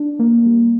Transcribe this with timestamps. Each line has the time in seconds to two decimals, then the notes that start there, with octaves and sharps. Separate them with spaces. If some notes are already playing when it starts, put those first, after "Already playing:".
Already playing: D4
0.19 A#3
0.46 G3